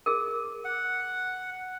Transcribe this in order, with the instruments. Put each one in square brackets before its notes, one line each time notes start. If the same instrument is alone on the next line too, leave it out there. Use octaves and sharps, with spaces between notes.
[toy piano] G#4 A#4
[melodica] F#5